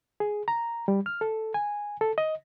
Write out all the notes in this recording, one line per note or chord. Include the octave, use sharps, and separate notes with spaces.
G#4
A#5
G3
F6
A4
G#5
A4
D#5